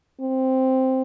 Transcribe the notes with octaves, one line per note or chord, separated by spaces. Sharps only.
C4